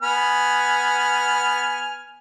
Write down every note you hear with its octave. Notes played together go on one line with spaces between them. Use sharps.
B3 G#5 F6